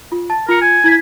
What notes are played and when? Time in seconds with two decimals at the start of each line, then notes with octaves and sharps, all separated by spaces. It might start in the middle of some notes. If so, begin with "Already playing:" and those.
0.12 F4
0.30 A5 A6
0.49 F4 A#4 C#7
0.62 G#5
0.84 E4 G#6 B6